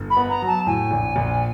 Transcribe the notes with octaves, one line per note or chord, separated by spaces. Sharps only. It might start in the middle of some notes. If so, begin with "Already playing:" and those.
Already playing: G1
B5
B3
A#5
F#3
A5
A2 G#5
A#1
A#1